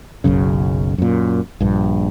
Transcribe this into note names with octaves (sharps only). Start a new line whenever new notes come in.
F#1 B1 F#2 C#3
F#2 A#2
A#1 G2